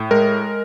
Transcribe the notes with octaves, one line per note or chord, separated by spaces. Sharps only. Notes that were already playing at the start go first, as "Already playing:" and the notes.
Already playing: A2
G#3 A#4